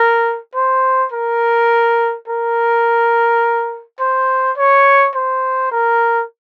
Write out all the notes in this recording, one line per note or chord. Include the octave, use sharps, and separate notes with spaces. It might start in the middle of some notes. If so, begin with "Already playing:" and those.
Already playing: A#4
C5
A#4
A#4
C5
C#5
C5
A#4